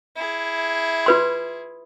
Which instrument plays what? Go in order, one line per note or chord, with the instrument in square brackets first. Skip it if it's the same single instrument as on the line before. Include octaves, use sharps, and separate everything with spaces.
[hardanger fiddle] E4 G#4
[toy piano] F4 B4 C6